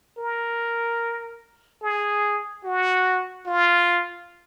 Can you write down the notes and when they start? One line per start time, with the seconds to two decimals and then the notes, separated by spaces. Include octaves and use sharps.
0.18 A#4
1.82 G#4
2.64 F#4
3.46 F4